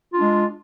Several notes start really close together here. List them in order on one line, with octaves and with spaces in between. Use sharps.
F4 D4 G#3